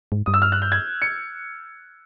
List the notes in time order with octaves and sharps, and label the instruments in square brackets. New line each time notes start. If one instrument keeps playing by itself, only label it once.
[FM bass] G#2
[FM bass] G2 [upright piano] D#6
[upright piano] E6
F6
F#6
G6
G#6
C#7